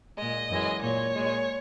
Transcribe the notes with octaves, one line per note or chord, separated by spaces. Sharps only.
A#2 G#3 D#5
F#2 E3 G#3
A#2 G#3 C#5
A#2 G#3